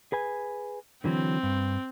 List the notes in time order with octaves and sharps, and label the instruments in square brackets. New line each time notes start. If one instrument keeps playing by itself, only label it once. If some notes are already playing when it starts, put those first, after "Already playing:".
[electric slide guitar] G#4 B4 G#5
[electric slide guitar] D3 E3 F#3 [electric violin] C4
[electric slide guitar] G2